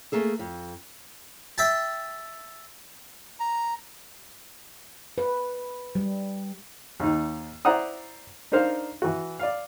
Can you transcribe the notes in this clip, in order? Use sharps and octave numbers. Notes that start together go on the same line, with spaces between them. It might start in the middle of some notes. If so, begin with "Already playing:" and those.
A3 A#3 G#4 A4
F2
E5 G5 A5
A#5
B4
G3
D#2 D#4
E4 C5 D5 F#5 A#5 D#6
D4 D#4 A#4 C5 F5
E3 F#4
D5 F5